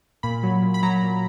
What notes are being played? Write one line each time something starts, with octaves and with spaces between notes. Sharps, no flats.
A#2 B5
F#3
A#2
B5
F#3 A#5
A#2